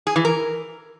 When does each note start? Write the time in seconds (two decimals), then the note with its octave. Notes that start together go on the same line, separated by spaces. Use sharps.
0.07 G#4
0.16 E3
0.25 A#4